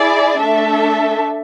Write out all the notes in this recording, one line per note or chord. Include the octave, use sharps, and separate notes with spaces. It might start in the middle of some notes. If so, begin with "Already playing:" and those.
Already playing: E4 G#4 D5
A3 D4 A4 E5